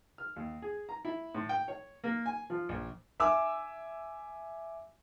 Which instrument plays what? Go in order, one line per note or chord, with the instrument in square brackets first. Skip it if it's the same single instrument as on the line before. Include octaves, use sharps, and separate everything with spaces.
[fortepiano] F6
D#2
G#4
A#5
E4
A2
G5
C#5
A#3
G#5
F3
A#1
[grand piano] E5 G#5 D6 E6